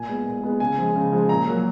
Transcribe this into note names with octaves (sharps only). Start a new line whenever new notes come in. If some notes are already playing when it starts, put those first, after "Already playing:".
Already playing: A#2 G#5
G#3 B3
A#2
G#3 B3
C#3 G#5
F3 G#3
C#3
F3 G#3
A#2 A#5
F#3 A#3